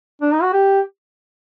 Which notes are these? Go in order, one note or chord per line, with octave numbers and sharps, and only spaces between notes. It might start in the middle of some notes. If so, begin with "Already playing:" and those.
D4
D#4
F#4
G4